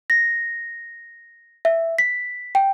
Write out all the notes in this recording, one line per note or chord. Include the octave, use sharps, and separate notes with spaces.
A#6
E5
B6
G5